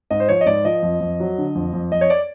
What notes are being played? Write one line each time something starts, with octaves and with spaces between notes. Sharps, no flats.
G#2 D#5
C5
F3 C#5
D#5
G#2 D5
F3 D#5
F2
F2
F#3
D3
F2
F2
F2 D#5
C#5
D5